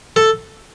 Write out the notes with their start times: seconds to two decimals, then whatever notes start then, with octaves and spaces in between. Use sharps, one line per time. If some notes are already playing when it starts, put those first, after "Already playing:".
0.16 A4